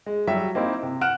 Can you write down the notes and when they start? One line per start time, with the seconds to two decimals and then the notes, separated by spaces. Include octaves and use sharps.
0.06 G#3
0.27 F#3 G3 E5
0.55 A#3 C4 D#4 E4
0.83 C3
1.01 F#5 F6 F#6 D7 E7